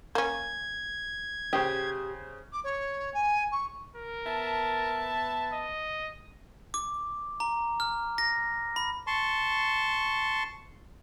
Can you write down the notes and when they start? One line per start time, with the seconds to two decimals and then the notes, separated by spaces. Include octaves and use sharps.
0.15 A#3 C#4 G#6
1.53 C#3 G4 C5 D#6
2.52 D6
2.64 C#5
3.14 G#5
3.51 C#6
3.95 A#4
4.26 B3 E5 A5
5.52 D#5
6.74 D6
7.40 A#5
7.80 F6
8.18 A#6
8.76 B5
9.07 A5 C6 C#6